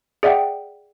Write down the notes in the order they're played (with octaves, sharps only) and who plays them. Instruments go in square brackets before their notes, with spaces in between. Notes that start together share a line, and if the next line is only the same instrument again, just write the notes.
[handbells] G#4 D5 E5 F#5 G5